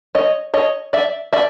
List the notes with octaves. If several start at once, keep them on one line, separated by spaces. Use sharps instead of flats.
C#5 D#5
C#5 D#5
D5 E5
D5 E5